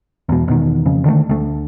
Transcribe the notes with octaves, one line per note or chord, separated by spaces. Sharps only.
E2 B2
E2 B2 D#3
F2 C#3
D3 D#3 G3 A3
D2 A3